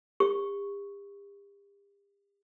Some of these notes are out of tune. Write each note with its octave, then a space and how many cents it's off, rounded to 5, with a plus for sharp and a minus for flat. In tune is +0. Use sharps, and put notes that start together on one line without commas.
G4 +40 C#6 +0